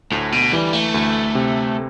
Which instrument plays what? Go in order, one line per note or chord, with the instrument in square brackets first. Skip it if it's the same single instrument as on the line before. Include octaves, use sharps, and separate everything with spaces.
[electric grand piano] D2 [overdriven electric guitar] A2
[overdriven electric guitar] B2
[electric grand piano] E3 [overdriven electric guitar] G3
[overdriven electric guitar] A3
[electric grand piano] D2
C3